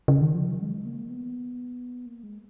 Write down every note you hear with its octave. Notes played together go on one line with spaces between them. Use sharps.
C#3
D#3
F3
F#3
G#3
A#3
B3
A#3
G#3